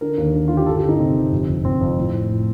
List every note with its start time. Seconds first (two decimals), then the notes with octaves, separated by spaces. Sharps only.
0.01 D3 A#4
0.18 D#2
0.34 D3
0.48 D3 F4
0.57 G4
0.66 G1 A4
0.77 G4
0.83 G1
0.89 D#4
0.99 C3 C4
1.16 G1
1.32 F2
1.49 F1
1.65 F2 C4
1.81 F2
1.98 A2
2.13 A2
2.30 A2